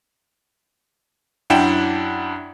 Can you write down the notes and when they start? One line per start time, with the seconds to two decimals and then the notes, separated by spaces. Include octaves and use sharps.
1.50 F#2 D4 E4 F#5 G5 E7